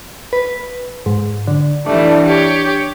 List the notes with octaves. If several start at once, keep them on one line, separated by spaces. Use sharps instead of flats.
B4
G#2
D3
E3 G3 A3 D4
G4 C#5